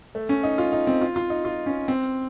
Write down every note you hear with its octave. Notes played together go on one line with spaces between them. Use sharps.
A3
C#4
D#4
F4
D#4
C4
F4
F4
D#4
F4
C#4
C4